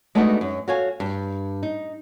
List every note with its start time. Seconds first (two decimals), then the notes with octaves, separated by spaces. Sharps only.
0.15 G#3 A3 B3 D4 D#4 F#4
0.41 F#2
0.68 F#4 A4 C#5 F5 G#5
1.00 G2
1.63 D#4